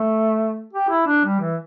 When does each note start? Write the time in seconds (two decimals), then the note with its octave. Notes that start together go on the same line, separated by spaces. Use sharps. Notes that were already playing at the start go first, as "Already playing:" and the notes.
Already playing: A3
0.73 G4
0.89 E4
1.06 D4
1.25 G3
1.41 E3